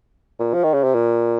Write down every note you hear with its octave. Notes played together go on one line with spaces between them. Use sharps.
A#2
F3
D#3
C#3
C3
A#2